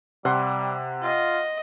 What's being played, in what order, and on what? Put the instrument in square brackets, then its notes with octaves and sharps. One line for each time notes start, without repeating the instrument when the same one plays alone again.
[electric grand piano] C3 [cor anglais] G3 [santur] F#5 C6
[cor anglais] F4 [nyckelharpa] D#5